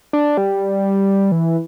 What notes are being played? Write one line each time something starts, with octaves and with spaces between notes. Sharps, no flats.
D4
G3
E3